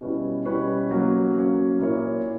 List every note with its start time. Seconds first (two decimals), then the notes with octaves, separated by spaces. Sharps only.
0.01 B2 G3 C#4 E4 B4
0.45 B2 G3 C#4 E4 B4
0.91 F#3 A#3 C#4
1.35 F#3 A#3 C#4
1.80 A#2 A#3 E4 A#4 C#5